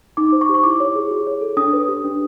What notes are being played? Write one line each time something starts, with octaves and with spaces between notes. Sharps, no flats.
D#4 D6
C5
C#6
G4
C#6
E4 D6
C#5
G#4
F#4
C#5
A4
D4 D#6
B4
G4
D4